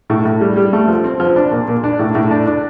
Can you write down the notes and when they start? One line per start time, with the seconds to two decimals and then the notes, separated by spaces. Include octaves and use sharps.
0.10 A2
0.25 A2
0.41 G3
0.56 G3
0.73 A3
0.88 F3
1.04 C4
1.20 F3
1.36 D4
1.52 A#2
1.68 A#2
1.84 D4
1.99 A2
2.15 A2
2.31 D4
2.46 D4